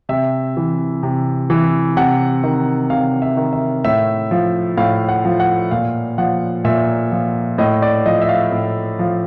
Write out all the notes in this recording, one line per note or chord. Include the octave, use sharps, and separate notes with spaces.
C3 E5
E3
C3
E3
C3 F#5
D#3
C3 F5
E5
D#3
E5
A2 E5
F3
A2 F5
F#5
F3
F#5
A#2 F5
F3 F#5
A#2 E5
F3
A2 D#5
D5
F3 D#5
E5
F5
A2
F3